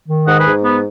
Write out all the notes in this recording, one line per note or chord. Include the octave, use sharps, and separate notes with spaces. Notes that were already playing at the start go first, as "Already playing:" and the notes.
D#3
G#2 D#5 F#5
G#4 B4
G#2
B3